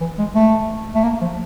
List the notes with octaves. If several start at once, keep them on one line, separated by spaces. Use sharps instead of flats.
E3
G#3
A3
A3
A#3
F3